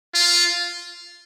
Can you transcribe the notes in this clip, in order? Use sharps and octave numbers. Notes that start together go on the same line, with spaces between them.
F4